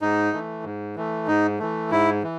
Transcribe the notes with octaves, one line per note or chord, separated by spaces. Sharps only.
G#2 D#4
E3 A3
G#2
E3 A3
G#2 D#4
E3 A3
G#2 E4
E3